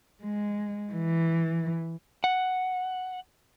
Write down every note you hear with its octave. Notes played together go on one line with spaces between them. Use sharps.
G#3
E3
F#5